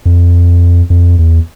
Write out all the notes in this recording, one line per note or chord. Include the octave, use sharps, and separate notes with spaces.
F2
F2
E2